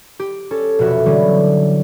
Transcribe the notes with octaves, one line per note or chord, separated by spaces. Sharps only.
G4
C#4 A4
F1 B2 F#4 E5
D3 E3 F#3 G3 B3 C#4